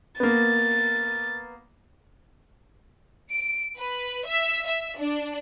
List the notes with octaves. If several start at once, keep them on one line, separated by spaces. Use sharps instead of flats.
A#3 B3 A6
D7
B4
E5
E5
D4